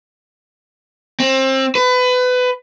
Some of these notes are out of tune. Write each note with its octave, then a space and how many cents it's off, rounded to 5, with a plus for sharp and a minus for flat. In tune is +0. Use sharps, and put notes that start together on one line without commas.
C4 +25
B4 +25